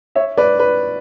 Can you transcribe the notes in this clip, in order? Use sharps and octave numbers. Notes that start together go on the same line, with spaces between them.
C#5 E5
B4 D5
B4